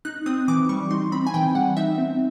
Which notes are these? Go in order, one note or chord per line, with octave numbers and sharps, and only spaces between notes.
D#4 F#6
C4 D#6
E3 D6
G3 C#6
D#4 C6
C4 B5
G#5
E3 G5
G3 F#5
D#4 E5
C4